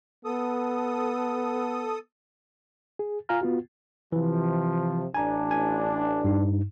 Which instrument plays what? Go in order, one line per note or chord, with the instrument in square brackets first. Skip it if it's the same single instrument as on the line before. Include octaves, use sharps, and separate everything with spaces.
[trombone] B3 [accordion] A4 D#6
[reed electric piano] G#4
F4 F5 G#5 A#5 F6
B3 F4 F#4
[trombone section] C3 F3 [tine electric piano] E3
[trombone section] A1 D4 [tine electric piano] G#5 A#5
[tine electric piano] G#5
G2 D#4